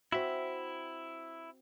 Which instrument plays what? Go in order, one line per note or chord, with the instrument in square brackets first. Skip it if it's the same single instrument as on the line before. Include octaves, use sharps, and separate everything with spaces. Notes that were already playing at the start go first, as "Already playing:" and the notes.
[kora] C4 F#4 [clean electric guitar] E4 E5